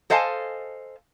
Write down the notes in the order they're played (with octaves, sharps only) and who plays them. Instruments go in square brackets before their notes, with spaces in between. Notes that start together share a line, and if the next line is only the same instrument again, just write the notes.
[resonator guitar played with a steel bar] A4 C5 D#5 F5 G#5 A5